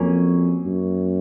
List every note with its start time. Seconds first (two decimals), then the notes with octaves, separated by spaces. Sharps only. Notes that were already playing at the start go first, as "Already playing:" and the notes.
Already playing: F2 F#3 A#3 C#4
0.66 F#2